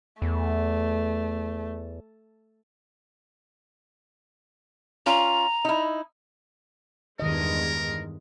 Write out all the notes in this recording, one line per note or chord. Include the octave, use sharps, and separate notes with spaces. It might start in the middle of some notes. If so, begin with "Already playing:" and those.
E2 A3
C#4 F4 A#5
D#4 E4
E2 G2 D#3 G#3 A#4 D#5